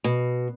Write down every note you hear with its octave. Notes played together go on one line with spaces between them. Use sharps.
B2